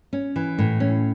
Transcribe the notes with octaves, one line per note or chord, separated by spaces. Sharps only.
C#4
E3
A2
C#4